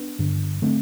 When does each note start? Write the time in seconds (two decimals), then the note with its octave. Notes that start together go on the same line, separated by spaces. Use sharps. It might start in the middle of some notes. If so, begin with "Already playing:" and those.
Already playing: B3 D4
0.19 G2 D3
0.62 D3 A3 C4